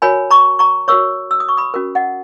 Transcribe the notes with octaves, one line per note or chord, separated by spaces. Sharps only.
F#4 A#4 C#5 G#5 B5
A#5 C#6
A#5 C#6
F#4 A#4 C#5 C#6 E6
E6
D#6
C#6
B5 D#6
C#4 F#4 A#4
D#5 F#5